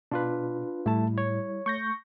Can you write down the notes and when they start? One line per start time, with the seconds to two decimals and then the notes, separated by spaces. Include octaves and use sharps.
0.11 B2 D4 F4 B4
0.86 A2 G3 A3 E4 A5
1.18 C#5
1.66 A3 C#6 G6 A#6